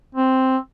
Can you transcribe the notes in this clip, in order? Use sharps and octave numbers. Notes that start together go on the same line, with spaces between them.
C4